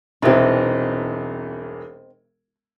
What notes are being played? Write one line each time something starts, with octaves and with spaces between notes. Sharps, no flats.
E1 C2 E3 C4 D#4